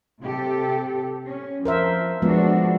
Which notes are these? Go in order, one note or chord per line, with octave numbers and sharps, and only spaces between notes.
C3 G4 A4
C#4
F3 A#4 C5 E5
F3 G#3 B3 D4 F#4